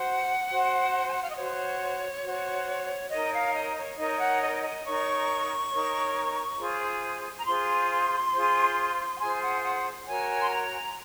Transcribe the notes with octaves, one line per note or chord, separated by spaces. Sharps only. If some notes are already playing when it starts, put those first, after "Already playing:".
Already playing: F#4 C5 F#5
F#4 C5
G#5
F#5
F5
D#5
F#4 C5 C#5
F#4 C5
D#4 A#4 C#5 D#5
F5
D#5
C#5
D#4 A#4 C#5 D#5
F#5
D#5
D#5
D#4 A#4 C#5 C#6
D#4 A#4 C#5
F4 G#4 C5
A#5
F4 G#4 C5 C6
F4 G#4 C5
F#5
F4 G#4 C5 G#5
F#5
F#5
F#4 A#4 C#5 G#5
C6
A#5